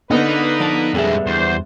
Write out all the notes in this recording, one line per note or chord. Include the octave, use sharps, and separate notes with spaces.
D3 A#3 B3 D#4 B4
F3 D5 A5
F2 G3 G#3 G#4 E5
E2 C5